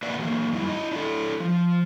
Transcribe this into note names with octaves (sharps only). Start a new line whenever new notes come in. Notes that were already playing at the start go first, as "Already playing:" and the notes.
A#3 B4 D5 E5 F#5
E3 F#3 A#3
F#2 G3 D#4 E4
E4 D#5
D4 E4 F4 A4
F3